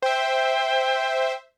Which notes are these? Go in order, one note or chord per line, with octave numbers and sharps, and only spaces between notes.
C5 E5 G5